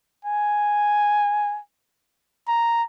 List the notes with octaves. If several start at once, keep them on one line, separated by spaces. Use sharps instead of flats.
G#5
A#5